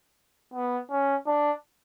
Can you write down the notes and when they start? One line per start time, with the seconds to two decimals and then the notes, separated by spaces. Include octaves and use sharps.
0.54 B3
0.90 C#4
1.26 D4